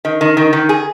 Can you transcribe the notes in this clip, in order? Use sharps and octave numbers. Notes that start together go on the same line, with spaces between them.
D#3
D#3
D#3
D#3
G#4